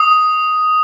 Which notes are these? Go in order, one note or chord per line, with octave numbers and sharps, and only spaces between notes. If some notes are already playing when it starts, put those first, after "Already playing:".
Already playing: D#6